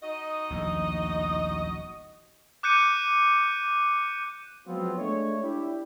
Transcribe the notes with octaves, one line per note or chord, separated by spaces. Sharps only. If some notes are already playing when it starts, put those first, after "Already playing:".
D#4 F#4 D#5
D#1 A#1 A2
D6 F#6 G6 C#7 D#7
F3 F#3 G#3 B3 C4 F4
G#3 A3 D4 C#5
D4 E4 G4